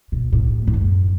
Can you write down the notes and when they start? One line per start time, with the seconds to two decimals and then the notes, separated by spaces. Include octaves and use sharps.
0.12 B2
0.33 A2
0.67 A2
0.74 F#2